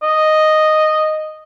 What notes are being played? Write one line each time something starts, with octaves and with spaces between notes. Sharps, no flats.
D#5